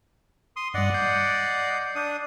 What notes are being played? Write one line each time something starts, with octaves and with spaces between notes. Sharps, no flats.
C6 D#6
G2 G3 D5 D#5 F#5
G6 C7
D4 D#6